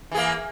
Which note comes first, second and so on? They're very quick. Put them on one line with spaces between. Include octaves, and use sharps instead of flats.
E3 G#4 A#3